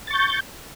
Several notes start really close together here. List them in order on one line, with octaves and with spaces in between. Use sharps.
A6 C#6 G6